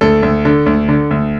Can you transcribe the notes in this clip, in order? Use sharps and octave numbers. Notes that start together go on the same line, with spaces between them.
D2 A4
D2
D3
D2
D3
D2